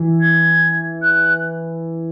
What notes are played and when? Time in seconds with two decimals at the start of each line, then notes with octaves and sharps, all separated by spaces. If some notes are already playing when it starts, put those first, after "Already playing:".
Already playing: E3
0.20 G#6
1.02 F#6